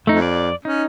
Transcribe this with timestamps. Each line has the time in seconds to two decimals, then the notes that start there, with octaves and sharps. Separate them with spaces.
0.07 F2 A3 D#4
0.22 D5
0.65 C#4 D#4